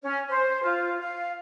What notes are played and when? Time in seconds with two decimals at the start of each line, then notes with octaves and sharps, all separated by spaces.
0.03 C#4
0.29 C5
0.62 F4
0.99 F5